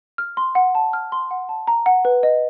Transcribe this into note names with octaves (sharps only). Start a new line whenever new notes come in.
F6
C6
F#5
A5
F6
C6
F#5
A5
A#5
F#5
B4
D#5